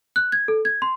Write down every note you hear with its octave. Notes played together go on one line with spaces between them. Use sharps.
F#6
G#6
A4
G#6
C6